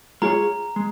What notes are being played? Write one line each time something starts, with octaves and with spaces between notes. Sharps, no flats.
G#3 F4 G#4 C#5 A#5
G#3